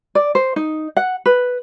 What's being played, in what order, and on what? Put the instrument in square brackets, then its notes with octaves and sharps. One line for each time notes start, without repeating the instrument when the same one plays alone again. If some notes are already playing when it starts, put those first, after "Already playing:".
[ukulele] D5
C5
D#4
F#5
B4